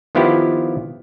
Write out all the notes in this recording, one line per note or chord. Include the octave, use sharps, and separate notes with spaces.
D#3 F3 B3 E4 F4 G4